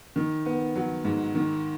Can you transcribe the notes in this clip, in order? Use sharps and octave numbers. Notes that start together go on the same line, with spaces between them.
D#3
B3
F#3
G#2
D#3